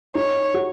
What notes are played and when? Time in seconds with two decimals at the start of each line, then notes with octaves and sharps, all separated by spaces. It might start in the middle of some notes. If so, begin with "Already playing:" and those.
0.15 D#4 C#5
0.54 F#4